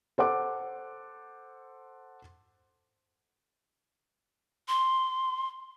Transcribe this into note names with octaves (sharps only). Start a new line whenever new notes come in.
A4 C5 F#5 D6
C6